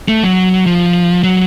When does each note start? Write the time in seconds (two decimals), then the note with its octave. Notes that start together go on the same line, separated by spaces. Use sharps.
0.08 A3
0.23 F#3
0.66 F3
1.23 F#3